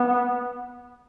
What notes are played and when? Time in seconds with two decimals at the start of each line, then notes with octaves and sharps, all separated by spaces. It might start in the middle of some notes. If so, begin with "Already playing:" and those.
Already playing: B3